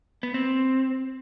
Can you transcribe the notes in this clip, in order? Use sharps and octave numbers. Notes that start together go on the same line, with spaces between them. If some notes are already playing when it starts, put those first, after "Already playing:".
B3
C4